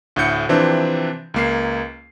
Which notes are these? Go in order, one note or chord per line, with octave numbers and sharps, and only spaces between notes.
D2 A2 F#5 G6 C#7
C3 E3 F3 C4 D4
C#2 A#3 C7